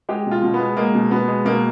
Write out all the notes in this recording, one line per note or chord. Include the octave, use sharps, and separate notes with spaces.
G#3 G4
B2
F4
B2
B3
G#3
G#3 A#3
B2
B2 B3
G#3
B2 A#3